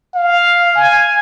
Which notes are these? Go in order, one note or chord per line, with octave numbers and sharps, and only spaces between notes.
F5
G#5